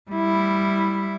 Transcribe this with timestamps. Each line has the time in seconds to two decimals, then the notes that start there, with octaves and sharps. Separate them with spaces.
0.11 G3 E4